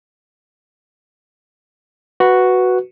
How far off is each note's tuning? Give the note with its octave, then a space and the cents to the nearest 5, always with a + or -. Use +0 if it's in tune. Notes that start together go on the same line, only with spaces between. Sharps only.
F#4 +0 B4 +0